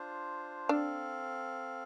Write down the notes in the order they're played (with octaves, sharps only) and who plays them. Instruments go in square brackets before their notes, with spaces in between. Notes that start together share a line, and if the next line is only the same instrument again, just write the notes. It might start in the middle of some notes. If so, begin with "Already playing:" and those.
Already playing: [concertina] D4 F4 C5
[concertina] C4 A4 F5 [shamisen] D4